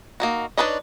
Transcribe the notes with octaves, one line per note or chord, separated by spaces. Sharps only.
A#3 D#4 F#4
D4 D#4 B4 C#5 D#5